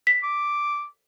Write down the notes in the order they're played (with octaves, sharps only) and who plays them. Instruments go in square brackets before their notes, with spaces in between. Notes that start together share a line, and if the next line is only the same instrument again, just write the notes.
[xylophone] B6
[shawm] D6